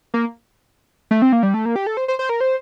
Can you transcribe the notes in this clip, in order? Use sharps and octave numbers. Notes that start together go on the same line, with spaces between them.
A#3
A3
C4
A#3
G3
A3
A#3
G4
A4
C5
C5
C5
A#4
C5